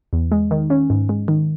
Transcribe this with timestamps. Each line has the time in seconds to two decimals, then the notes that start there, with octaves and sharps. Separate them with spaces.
0.13 E2
0.32 G#3
0.51 D#3
0.70 C#4
0.90 G#2
1.09 G#3
1.28 D#3